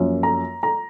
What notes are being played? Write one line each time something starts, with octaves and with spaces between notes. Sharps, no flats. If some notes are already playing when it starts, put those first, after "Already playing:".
Already playing: F#2 F3 A#3 C#4
A#5
A#5